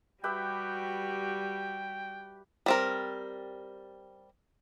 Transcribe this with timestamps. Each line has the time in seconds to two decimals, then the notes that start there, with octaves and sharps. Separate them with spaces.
0.24 G3 F#4 G4 B4 E5 G5
2.66 G3 C4 A#4